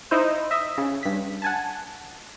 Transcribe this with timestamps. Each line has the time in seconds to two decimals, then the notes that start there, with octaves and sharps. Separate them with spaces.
0.11 D#4 E4 C5
0.51 D#5 E5
0.78 C#3
1.03 G2 B6
1.42 F#5 G#5 A5